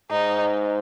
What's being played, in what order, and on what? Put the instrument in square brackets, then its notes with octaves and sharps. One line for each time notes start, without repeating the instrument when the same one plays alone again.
[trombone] G#2 [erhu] D#4